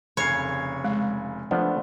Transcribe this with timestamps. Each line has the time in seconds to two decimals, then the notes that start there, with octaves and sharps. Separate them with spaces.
0.17 F1 C#3 C#5 C7
0.84 G#3
1.51 F3 A3 B3 D4